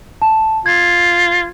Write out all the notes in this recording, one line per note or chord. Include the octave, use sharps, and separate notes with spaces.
A5
F4 G#6